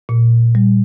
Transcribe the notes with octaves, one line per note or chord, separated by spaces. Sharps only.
A#2
G3